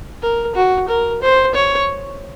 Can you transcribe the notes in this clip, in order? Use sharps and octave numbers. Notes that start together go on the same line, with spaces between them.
A#4
F#4
A#4
C5
C#5